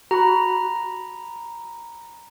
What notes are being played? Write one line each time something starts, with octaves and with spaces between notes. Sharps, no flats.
F#4 A#5 B5